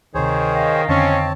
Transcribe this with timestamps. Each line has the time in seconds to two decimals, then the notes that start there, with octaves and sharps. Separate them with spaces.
0.14 D2 C3 D#3 G#4 C5 C#5
0.52 D#5 F5 G5
0.88 F2 D3 D#3 C4 C#4 C#5 A5